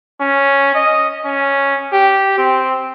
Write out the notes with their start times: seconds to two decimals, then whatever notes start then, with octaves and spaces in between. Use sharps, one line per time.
0.21 C#4
0.75 D#5
1.25 C#4
1.93 G4
2.38 C4